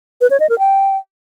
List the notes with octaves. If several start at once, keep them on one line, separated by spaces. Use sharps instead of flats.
B4
C#5
D#5
A#4
G5